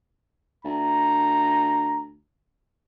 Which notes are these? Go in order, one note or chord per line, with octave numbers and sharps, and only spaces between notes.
D2 A#5